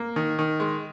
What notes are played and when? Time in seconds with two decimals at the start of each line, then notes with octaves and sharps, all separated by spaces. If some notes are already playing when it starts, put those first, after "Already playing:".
Already playing: A#3
0.16 D#3
0.39 D#3
0.60 G#3